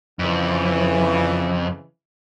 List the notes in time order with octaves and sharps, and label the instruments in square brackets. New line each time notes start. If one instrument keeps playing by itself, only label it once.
[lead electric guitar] F2 [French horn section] C#3 E3